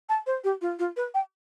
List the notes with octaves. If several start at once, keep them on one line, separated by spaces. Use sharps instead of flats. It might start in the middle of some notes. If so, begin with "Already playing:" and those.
A5
C5
G4
F4
F4
B4
G5